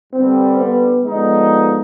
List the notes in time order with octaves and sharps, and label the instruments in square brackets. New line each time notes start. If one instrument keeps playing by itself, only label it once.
[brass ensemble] G2 D3 G3 [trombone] C4
[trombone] B3
[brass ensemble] D3 F3 B3 D#4 [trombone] G#3